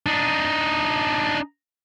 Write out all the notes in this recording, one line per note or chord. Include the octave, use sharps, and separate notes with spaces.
D4 D#4